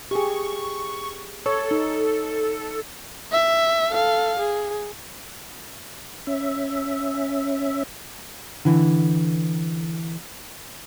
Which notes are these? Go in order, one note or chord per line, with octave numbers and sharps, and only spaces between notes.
G4 G#4 C#6
A4 C#5
D#4
E5
A4 F5
G#4
C#4 E5
D3 E3